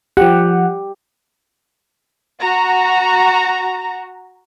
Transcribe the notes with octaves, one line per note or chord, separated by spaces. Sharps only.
F3 G4 F#5
F#4 A#5